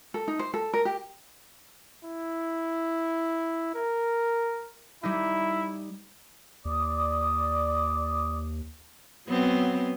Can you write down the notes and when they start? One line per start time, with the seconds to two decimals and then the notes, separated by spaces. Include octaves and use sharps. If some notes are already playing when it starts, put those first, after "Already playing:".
0.14 A4
0.28 D#4
0.39 C5
0.54 A4
0.74 A#4
0.85 G4
2.04 E4
3.75 A#4
5.03 G3 D#4 E4
6.65 D#2 D5 D6 D#6
9.29 F#3 B3 C4